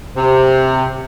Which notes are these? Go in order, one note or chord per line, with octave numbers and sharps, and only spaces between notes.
C3